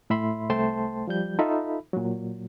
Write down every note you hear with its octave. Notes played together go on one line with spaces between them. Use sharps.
A2 E5 B5 C6
C2 A3 C5 G5 A5 C6
F3 G3 G6
D#4 F4 A4 E5 B5
A#2 F#3